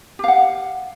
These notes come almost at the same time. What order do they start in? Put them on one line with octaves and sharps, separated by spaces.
G4 F5 F#5